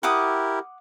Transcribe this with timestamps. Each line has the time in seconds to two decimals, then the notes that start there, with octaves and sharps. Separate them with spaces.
0.03 E4 G4 A#4 F#5 D6 D#6